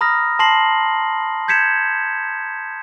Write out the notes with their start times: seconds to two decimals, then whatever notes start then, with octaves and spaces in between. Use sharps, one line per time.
0.01 A#5 B5 D#6 F6 A#6
0.39 A5 C6 A#6 C7 F#7
1.48 G6 G#6 B6 C#7 E7